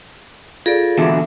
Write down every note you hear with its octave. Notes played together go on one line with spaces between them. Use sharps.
F4 G#4 A4 D5
E2 B2 D3 E5 D6